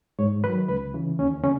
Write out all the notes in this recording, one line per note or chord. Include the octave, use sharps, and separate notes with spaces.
G#2 C#5
D#3 F#3 B4
C#2 B4
C#3 E3
D#2 C#4
C#3 C#4